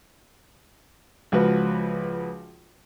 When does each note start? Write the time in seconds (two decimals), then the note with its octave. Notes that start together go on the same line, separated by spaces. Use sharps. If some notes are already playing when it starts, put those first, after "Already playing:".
1.32 C#2 F3 F#4 B4